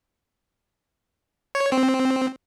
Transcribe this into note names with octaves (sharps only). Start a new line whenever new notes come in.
C#5
C4